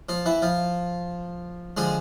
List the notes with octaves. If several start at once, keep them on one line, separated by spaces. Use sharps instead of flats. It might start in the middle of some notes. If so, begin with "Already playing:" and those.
F3 F4
E3 E4
F3 F4
D3 F3 G#3 G#4